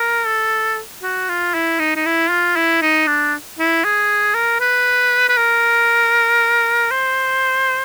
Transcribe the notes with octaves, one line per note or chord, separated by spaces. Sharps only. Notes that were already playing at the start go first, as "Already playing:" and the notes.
Already playing: A#4
A4
F#4
F4
E4
D#4
D#4
E4
F4
E4
D#4
D4
E4
G#4
A#4
B4
B4
A#4
C5